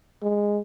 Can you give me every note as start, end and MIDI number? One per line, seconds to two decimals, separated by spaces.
0.22 0.60 56